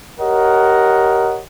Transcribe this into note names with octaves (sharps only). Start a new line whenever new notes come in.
G4 A#4 C#5 D#5 F#5